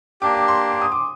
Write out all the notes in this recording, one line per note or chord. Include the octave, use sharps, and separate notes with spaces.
A#3 D4 G4 D6
D6
C6
D6
D#6
D6